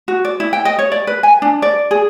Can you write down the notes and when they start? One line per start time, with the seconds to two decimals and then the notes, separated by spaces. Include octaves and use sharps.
0.08 F#4
0.25 D5
0.40 E4
0.53 G5
0.65 D#5
0.79 C#5
0.92 D5
1.07 B4
1.23 G#5
1.42 D4
1.62 D5
1.91 G#4